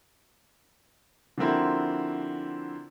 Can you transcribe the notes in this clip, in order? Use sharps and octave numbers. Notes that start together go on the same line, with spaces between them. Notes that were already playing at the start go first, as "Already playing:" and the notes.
D3 F3 A#3 C4 E4 F#4